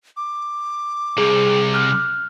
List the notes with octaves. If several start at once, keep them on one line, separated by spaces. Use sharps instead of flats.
D6
C2 C3 G#4
F6 F#6